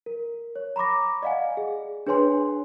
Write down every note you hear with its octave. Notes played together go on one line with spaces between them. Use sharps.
A#4
C#5
A#5 B5 C#6 D6 A#6
D5 D#5 F5 F#5 G#5
G#4
D4 G#4 B4 C#5 G#5 C6